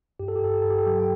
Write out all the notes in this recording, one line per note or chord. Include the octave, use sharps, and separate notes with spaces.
G2 G4
A4
G4
G2 A4
G4
G2 A4
G4
A4
F#3 G4
G5